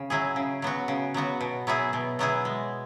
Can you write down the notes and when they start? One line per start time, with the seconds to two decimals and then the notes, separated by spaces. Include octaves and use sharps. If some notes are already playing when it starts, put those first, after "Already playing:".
Already playing: C#3
0.10 F#3 E4 G#4
0.36 C#3
0.62 F#3 B3 F#4
0.88 C#3
1.14 F#3 B3 F#4
1.41 B2
1.67 F#3 B3 E4 G#4
1.93 B2
2.19 F#3 B3 E4 G#4
2.45 G#3